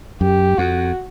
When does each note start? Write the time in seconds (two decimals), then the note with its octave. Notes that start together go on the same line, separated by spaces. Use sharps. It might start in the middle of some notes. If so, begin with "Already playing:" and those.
0.21 F#2 G4
0.58 F2 F#4